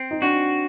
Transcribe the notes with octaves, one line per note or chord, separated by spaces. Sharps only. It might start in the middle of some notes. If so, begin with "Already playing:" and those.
Already playing: C4
D#4
D4 F#4